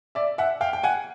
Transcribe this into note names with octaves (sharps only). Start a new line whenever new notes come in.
D5 E5
E5 F#5
F5 G5
G5
F#5 G#5